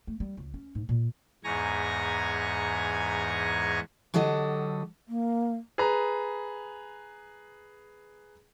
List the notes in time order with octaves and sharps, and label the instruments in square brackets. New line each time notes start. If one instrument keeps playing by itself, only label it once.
[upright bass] A3
G3
C#2
C#4
G#2
A#2
[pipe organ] E2 G#2 G#5 A#5 C#6 A#6
[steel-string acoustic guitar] D3 F#3 G4 A4 D#5
[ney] A#3
[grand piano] G#4 B4 A#5